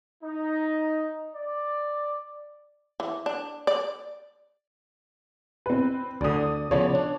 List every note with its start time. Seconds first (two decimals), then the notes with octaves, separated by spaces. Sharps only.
0.24 D#4
1.35 D5
3.00 E3
3.26 D4
3.67 D5
5.66 C4 B4
6.21 D2 D3 D5 D#6
6.71 C#3 F3 B3 C#5 D5
6.95 D4